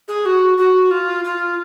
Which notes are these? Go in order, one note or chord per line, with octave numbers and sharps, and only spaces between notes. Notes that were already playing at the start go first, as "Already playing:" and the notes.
G#4
F#4
F#4
F4
F4